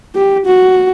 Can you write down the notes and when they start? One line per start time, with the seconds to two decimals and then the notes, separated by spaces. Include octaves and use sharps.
0.15 G4
0.47 F#4